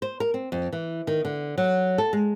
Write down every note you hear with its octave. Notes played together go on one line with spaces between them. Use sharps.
C5
A#4
C4
F2
E3
D#3
D3
F#3
A4
G#3